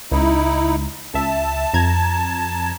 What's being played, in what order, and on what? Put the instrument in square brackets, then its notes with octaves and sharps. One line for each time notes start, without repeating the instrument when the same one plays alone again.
[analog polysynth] C#2 [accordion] D#4 E4
[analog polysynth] C#2 E5 [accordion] A5
[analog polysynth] F2 A#5 G#6